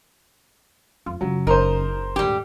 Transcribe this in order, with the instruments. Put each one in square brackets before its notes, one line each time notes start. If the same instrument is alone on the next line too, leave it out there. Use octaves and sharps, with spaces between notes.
[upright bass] F2 [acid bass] F4
[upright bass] F#2 C#3 [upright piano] F#3
[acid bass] F#1 [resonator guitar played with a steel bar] D#4 [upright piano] A#4 C5
[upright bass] D#1 G#2 [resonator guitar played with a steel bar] G3 G4